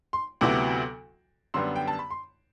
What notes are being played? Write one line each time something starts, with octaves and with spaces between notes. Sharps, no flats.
C6
D2 C3 F#3 B3 E4 D6
F#2 D3 G3 B3 C6
G5
A5
B5
C6